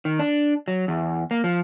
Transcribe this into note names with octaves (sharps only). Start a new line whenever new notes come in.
D#3
D4
F#3
E2
A#3
F3